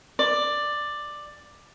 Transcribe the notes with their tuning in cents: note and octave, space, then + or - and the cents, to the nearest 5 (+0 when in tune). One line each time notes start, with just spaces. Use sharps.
D5 +10